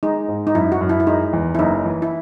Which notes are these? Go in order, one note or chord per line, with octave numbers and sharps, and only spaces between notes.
G#3 D#4
G#2
D#4
F#2 E4
F#4
F#2
E4
E4
G#3 D#4
E2
E4
F#1 D#4
E3
E4